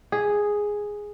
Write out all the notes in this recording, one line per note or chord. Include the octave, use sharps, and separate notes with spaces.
G#4